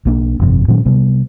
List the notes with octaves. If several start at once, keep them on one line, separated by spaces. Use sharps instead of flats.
B1 A#3 D4
G1 F2 C3
A#2 D#3 F#3 C#4
C3 G3 B3